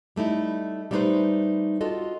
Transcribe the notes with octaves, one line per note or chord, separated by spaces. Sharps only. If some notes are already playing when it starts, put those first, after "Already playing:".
G3 A3 D#4 E4
G3 A3 B3 D#4 B4 C5
F4 F#4 A4 D#5